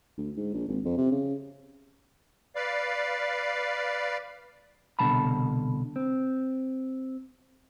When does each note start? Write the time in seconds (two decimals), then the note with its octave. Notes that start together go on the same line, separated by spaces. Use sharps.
0.17 D2
0.37 G#2
0.54 A#1
0.68 G#1
0.85 F2
0.97 C3
1.11 C#3
2.56 B4 D5 F5
4.99 C2 B2 D3 E3 A5 B5
5.96 C4